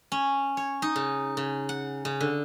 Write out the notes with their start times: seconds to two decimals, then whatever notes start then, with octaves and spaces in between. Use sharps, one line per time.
0.12 C#4
0.57 C#5
0.82 D#4
0.96 C#3
1.37 C#3
1.69 F#5
2.05 C#3
2.20 D3